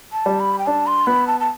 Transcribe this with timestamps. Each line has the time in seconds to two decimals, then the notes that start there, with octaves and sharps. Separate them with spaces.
0.13 A5
0.26 G3
0.40 B5
0.59 G5
0.67 D4 A5
0.87 C6
1.07 B3 B5
1.27 A5
1.40 A5